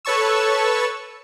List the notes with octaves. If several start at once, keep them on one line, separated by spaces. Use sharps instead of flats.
A4 B4 C#5 A5 C#6 E6